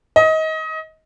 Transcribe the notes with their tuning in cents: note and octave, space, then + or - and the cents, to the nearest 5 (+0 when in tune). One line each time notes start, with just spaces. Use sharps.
D#5 +25